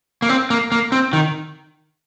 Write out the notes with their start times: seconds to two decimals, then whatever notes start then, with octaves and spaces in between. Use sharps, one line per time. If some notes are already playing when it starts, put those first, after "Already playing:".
0.22 A#3
0.29 C4
0.50 A#3
0.72 A#3
0.92 C4
1.13 D#3